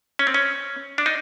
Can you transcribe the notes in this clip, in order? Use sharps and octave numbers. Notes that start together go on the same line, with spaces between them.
C#4
C4
C#4
D4
D#4